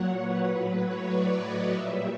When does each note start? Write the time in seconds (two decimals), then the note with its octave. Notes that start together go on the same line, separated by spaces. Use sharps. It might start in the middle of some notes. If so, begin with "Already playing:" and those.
Already playing: A#2 F#3 C#5 F#5
0.19 B4
0.51 A2 F#3 B4
0.82 C#5
1.13 D5
1.44 D#5
1.75 A#2 G3 E5